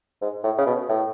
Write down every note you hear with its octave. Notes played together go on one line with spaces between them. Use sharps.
G#2
A2
C#3
B2
A2